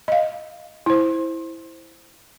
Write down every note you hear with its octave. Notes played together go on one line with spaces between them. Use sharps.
D#5 F5
E4 C5